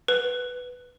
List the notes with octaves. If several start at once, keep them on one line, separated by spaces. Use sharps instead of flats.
B4